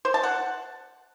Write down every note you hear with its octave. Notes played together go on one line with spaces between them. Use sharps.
C5
A5
F#5